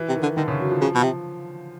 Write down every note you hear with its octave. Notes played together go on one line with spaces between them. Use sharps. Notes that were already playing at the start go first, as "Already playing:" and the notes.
Already playing: E3
C3
D#3
D3
D3 D#3
C#3
F#3
F3
C#3 F3
B2
C3